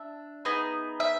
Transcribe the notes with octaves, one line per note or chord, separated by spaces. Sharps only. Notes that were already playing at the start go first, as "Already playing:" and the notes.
Already playing: D4 E5
B3 D#4 G#4
E5